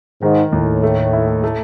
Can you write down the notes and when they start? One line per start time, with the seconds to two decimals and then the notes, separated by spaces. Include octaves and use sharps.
0.22 G#2 D#3
0.52 D#2 A2
0.83 A3
1.13 E4
1.44 A3